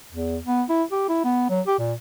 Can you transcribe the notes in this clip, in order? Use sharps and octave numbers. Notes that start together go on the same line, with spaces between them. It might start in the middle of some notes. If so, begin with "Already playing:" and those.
E2
B3
E4
G4
E4
B3
F#3
G4
A#2